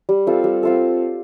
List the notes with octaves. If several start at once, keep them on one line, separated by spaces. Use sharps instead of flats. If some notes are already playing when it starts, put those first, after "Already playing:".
G3
C4 F4 A4
G3
C4 F4 A4